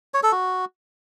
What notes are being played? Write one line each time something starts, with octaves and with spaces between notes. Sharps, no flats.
C#5
A4
F#4